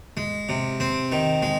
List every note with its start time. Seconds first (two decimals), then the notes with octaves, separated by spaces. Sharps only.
0.17 G#3
0.49 C3
0.80 C4
1.12 D#3
1.42 G#3